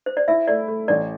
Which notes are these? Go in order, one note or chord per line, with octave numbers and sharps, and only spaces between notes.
C5
D5
E4 E5
A3 D5
A3
A1 D5